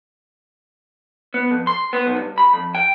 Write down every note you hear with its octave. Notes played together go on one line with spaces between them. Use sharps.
B3
F2
C6
B3
B1
G2
B5
F2
G5